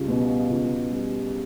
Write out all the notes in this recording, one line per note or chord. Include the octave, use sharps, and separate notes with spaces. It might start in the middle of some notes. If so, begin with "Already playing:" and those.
Already playing: C#2 G3
B2
C#2
G3